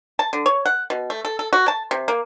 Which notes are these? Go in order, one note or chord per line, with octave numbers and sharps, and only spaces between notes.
A5
D3
C#5
F#5
B2
A3
A4
A4
F#4
A5
C3
A#3